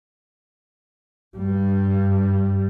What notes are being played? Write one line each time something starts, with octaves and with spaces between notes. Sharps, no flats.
G2 G3